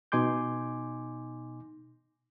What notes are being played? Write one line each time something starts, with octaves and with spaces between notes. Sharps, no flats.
B2 D#4 G#5 C6 D6 G6